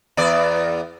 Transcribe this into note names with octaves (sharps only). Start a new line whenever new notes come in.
E2 B3 D5